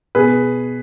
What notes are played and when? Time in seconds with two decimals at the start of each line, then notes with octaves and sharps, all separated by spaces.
0.15 B2 G#4 B4